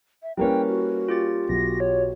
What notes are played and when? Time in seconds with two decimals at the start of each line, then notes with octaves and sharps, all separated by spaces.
0.23 E5
0.37 G3 A#3 C#4 E4 B4 G5
0.68 F#4
1.09 F4 G4 A6
1.49 B1 F#4 A#6
1.80 C#5